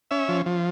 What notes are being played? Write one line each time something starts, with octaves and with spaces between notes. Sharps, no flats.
C#4 E5
F3
F3